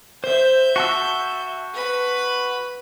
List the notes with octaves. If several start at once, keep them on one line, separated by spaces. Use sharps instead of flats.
C5 E5 G6
F#4 A5 E6
B4 B5